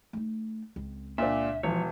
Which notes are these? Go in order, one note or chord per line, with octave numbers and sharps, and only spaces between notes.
A3 D#4
C#2 C4
A#2 D4 E5
E1 F3 C#5